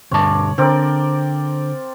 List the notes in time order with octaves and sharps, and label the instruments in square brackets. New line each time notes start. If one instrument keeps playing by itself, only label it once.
[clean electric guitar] D2 G2 A5 [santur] C#5 D5
[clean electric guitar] D3 [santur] C4 A#4 D5